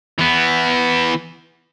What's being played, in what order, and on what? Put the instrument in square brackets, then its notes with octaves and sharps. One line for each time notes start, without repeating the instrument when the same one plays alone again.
[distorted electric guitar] E3 B3